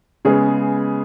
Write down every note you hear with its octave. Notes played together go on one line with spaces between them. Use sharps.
C#3 G#3 B3 G#4